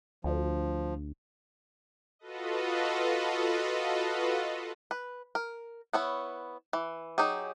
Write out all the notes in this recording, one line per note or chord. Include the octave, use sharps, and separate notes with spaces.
D2 F3
F4 F#4 A4 B4 D#5
B4
A#4
B3 E4 C#5
E3
F#3 D#4 G4 G#4